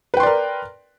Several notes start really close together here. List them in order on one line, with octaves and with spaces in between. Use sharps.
B4 G5 C6 D5 A#4